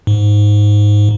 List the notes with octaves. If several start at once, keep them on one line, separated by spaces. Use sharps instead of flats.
G#2